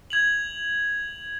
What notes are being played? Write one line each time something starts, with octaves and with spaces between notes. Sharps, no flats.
G#6 F7 F#7